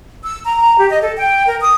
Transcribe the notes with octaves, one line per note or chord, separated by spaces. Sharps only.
E6
A#5
A#5
G4
D#5
A4
G5
A#4
D#6